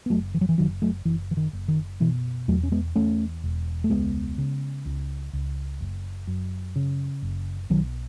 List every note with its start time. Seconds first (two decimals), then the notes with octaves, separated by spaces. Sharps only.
0.06 B3
0.10 F#1 F#3 A3
0.35 E3
0.41 F#3
0.49 E3
0.58 F#1 D#3 F#3
0.82 F#3 A3
1.05 F#1 E3
1.31 E3
1.37 D#3
1.53 F#1
1.68 D#3
2.00 B2 E3
2.48 E2 F#3 A3
2.63 C#4
2.72 G#3 B3
2.95 E2 A3 C#4
3.44 E1
3.84 A3
3.90 C#2 G#3 B3
4.38 C#3
4.86 C#2
5.33 C#2
5.81 F#1
6.27 F#2
6.76 C#3
7.22 F#1
7.70 B1 D#3 F#3